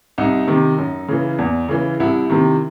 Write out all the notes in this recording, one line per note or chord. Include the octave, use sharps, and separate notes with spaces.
C2 D#4
C3 D#3
F#2
C#3 E3
E2
C#3 E3
C2 E4
C3 D#3